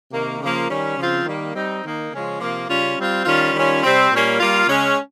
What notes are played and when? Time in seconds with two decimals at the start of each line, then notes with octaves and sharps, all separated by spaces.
0.12 C3 D#3 A#3
0.40 C#3 F3 A#3 F4
0.69 D#3 G3 C#4
0.98 C#3 F3 C4 F4
1.26 D#3 G3 A#3
1.54 G3 C4 D#4
1.83 D#3 A#3 D#4
2.12 C#3 F3 G#3 C#4 F4
2.40 C3 F3 A#3
2.68 C#3 G3 C#4 F4
2.97 G3 C4 F4
3.25 D#3 G3 C#4 F4
3.54 D#3 G3 C#4 F4
3.83 C3 G3 C4
4.12 A#2 G3 A#3 C#4
4.40 G3 A#3 F4
4.68 C#3 G#3 C#4